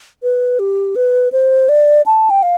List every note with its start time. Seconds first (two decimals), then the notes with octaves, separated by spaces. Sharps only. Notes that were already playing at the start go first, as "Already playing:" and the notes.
0.23 B4
0.59 G4
0.96 B4
1.32 C5
1.69 D5
2.06 A5
2.30 G5
2.43 F5